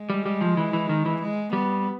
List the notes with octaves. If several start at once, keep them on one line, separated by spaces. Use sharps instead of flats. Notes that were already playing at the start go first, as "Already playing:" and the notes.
Already playing: G#3
G3
G3
F3
E3
E3
D#3
E3
G#3
G3 B3